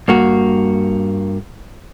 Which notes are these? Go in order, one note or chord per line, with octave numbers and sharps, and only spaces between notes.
G2 A#3 F#4